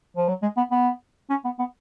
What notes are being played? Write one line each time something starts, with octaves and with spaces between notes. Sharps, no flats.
F3
F#3
G#3
B3
B3
C#4
B3
B3